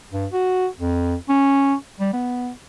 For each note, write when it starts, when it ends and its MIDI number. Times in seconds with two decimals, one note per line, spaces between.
0.11 0.26 43
0.32 0.67 66
0.80 1.15 41
1.29 1.75 61
2.00 2.11 55
2.13 2.51 59